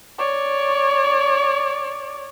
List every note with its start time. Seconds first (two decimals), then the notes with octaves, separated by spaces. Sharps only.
0.18 C#5 D5